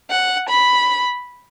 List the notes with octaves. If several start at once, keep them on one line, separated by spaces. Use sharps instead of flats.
F#5
B5